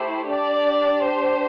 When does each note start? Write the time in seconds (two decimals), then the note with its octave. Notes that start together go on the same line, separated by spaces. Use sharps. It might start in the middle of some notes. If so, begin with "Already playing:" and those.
Already playing: A3 E4 G4 C5
0.30 D4 G4 D5
1.05 C5